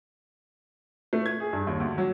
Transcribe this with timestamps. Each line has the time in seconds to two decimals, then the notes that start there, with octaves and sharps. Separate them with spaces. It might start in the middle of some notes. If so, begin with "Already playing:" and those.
1.13 A3
1.26 G#6
1.40 G#4
1.53 G2
1.67 D#2
1.80 D2
1.98 F#3